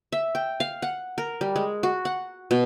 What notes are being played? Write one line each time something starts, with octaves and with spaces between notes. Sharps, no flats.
E5
G5
F5
F#5
A#4
G3
G#3
F#4
F#5
B2